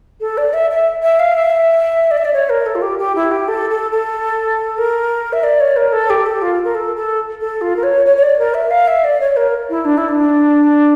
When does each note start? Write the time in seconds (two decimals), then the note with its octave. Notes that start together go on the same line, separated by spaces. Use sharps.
0.20 A4
0.37 D5
0.53 E5
0.70 E5
1.02 E5
1.19 F5
1.35 E5
2.10 D5
2.17 E5
2.24 D5
2.33 C#5
2.49 A#4
2.66 A4
2.75 F4
2.81 G4
2.98 G4
3.15 E4
3.31 G4
3.48 A4
3.70 A4
3.91 A4
4.78 A#4
5.32 E5
5.43 D5
5.60 C#5
5.76 A#4
5.92 A4
6.09 G4
6.25 A4
6.41 F4
6.64 A#4
6.74 A4
6.96 A4
7.40 A4
7.61 F4
7.76 A#4
7.83 C#5
8.05 C#5
8.16 C#5
8.22 D5
8.38 A#4
8.54 E5
8.70 F5
8.87 E5
9.04 D5
9.20 C#5
9.36 A#4
9.69 E4
9.84 D4
9.97 E4
10.08 D4